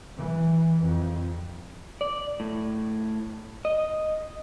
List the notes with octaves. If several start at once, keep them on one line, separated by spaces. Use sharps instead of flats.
E3
F2
D5
A2
D#5